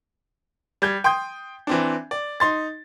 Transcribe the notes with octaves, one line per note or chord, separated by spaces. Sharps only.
G3 G6 G#6
G5 C6 D#6 G6
E3 C4 D4
D5
D#4 C6 A6